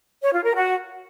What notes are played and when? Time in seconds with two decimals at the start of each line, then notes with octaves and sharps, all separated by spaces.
0.22 C#5
0.33 F4
0.44 A#4
0.54 F#4